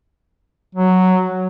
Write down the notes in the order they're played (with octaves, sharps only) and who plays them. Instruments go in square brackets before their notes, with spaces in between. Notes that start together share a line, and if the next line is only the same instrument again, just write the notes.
[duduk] F#3